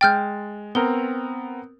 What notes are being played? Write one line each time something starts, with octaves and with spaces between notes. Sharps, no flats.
G#3 G5 F6 G6 A6
B3 C4 A#4 G7